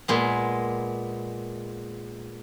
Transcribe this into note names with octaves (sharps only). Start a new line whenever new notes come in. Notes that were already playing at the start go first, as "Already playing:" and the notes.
A#2 G#3 B3